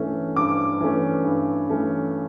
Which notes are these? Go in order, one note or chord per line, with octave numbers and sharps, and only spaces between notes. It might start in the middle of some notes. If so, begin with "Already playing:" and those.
Already playing: G2 E3 A3 C#4
G2 D6
E3 A3 C#4
G2
E3 A3 C#4